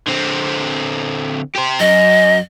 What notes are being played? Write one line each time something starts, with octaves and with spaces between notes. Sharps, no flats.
D3 C4
G4 C5
F#2 D#5